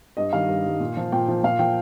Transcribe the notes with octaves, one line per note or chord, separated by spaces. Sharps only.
G2 D#5
D#3 G3 F5
G2
D#3 G3
A#2
F3
A#2 G5
F3
A#2 F5
F3 G5